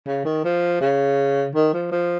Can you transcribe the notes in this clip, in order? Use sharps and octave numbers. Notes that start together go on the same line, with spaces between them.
C#3
D#3
F3
C#3
D#3
F3
F3